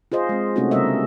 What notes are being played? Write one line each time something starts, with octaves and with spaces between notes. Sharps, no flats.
F4 G#4 C5 D#5
G#3 C4
C3 A3 C4 C#4 D#4 F#4
C#3 G3 B3 A#4 D#5 E5